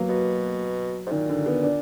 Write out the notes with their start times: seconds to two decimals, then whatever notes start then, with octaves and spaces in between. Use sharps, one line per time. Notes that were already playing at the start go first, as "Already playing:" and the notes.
Already playing: F#3 A#3 B3
0.09 B2
1.06 G#2
1.11 A#2 D#3
1.29 D3
1.46 B3
1.63 D4